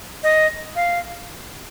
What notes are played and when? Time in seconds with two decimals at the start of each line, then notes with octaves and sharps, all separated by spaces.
0.23 D#5
0.76 F5